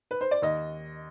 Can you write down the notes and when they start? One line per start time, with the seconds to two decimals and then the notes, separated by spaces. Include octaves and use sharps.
0.11 B4
0.21 C5
0.31 D5
0.42 D#2 D#5